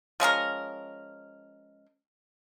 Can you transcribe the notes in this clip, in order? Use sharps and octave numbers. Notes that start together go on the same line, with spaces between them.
F3 G#3 C#4 A#4